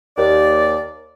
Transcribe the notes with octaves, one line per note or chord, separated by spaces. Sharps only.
D#2 D5